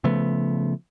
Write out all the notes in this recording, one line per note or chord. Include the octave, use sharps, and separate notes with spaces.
C#3 F3 A3 B3